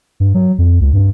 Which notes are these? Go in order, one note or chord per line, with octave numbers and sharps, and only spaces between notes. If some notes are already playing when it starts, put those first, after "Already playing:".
G2
F#3
F2
C#2
G2